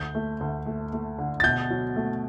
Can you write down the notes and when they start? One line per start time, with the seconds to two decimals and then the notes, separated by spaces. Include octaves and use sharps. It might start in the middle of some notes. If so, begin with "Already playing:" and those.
Already playing: D2 G6
0.15 A3
0.41 D2
0.66 A3
0.93 A3
1.18 D3
1.40 A6
1.44 B2 G6
1.70 F#3
1.96 A3